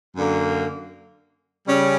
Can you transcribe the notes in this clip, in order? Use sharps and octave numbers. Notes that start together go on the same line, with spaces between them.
F#2 D3 A#3
C#3 G3 C#4